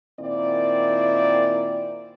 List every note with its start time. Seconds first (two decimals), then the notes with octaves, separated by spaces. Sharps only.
0.20 A#2 D#3 C4 E4 D5